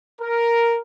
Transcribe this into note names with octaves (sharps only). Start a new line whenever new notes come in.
A#4